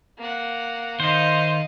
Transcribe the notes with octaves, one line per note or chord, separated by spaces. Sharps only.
A#3 F#5
D#3 C5 D#5 F5